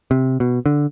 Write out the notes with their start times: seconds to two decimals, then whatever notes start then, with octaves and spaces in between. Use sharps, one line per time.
0.11 C3
0.40 B2
0.66 D3